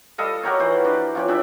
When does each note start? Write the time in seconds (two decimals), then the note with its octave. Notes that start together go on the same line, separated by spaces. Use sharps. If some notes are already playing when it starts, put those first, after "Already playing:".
0.18 G3 A4 D#5 F5
0.43 F#4 G4 A#4 C#5
0.60 E3 C5
0.85 D4 B4
1.15 F3 C#4 G4
1.28 C#3 D4 E5